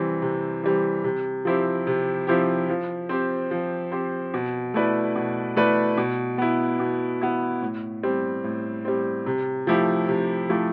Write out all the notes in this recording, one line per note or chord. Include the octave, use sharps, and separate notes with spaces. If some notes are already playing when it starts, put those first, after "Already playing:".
Already playing: C3 E3 G3 C4
C3
E3 G3 C4
C3
F3 C4 E4 G4
C3
F3 C4 E4 G4
F3
C4 G4 C5
F3
C4 G4 C5
B2
A3 E4 B4 D5
B2
A3 E4 B4 D5
B2
B3 E4
B2
B3 E4
A2
G3 C4
A2
G3 C4
C3
F3 A3 E4 G4
C3
F3 A3 E4 G4